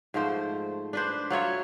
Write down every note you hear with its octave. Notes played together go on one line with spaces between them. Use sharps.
G#2 F3 A3 C5
D4 B4 C5
F#3 F4 C#5 E5